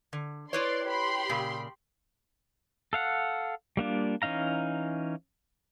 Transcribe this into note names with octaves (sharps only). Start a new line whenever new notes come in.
D3
E4 B4 C#5 D5 C6
G4 B5 C6
A#2 C#3
A4 F5 F#5
G3 A#3 D4 F4
E3 C#4 D#4 F5 A#5